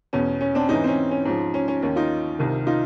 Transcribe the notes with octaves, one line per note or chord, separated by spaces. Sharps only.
E2 B2 C#4
C#4
C4 D4
G#2 E3 C#4 D#4
C4
C#4
C#4
G#2 F3
C#4
C#4
D#2 D#3 C#4
D#4 F4
C2 C3 D#3
D#4 F4